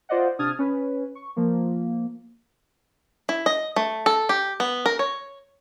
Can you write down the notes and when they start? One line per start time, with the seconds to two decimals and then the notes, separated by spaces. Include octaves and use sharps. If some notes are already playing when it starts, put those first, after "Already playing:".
0.09 F4 C5 D5 D#5 F#5
0.39 C3 D4 D#6 F6 G#6 A6
0.59 C#4 B4 C#5
1.15 C#6
1.36 F3 A#3
3.29 E4
3.46 D#5
3.76 A3
4.06 A4
4.29 G4
4.60 B3
4.86 A#4
4.99 C#5